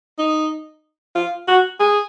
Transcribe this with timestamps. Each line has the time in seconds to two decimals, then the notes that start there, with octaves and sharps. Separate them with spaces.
0.19 D#4
1.15 F4
1.48 F#4
1.80 G#4